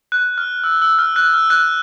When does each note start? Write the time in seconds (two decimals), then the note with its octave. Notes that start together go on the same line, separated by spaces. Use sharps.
0.12 F#6
0.38 F6
0.64 E6
0.82 E6
0.99 F6
1.16 F#6
1.34 F6
1.50 F#6